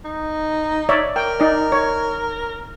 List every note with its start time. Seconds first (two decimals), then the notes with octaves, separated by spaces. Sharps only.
0.05 D#4
0.89 C#5 D5 E5
1.16 A#4 G5
1.40 D#4 D5
1.72 C#5